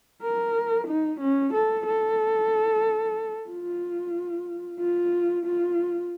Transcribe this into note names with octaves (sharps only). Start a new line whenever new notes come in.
A#4
D#4
C#4
A4
A4
F4
F4
F4